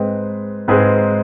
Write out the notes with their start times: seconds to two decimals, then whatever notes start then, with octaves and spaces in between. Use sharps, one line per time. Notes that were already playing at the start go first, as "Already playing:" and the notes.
Already playing: G#2 G#3 C4 G#4 B4
0.68 G#2 G#3 C4 G#4 B4